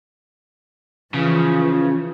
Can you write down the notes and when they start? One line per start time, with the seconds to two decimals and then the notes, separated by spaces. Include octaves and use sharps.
1.14 C#3 E3 F3